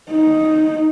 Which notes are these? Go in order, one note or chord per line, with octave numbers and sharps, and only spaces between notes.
D#4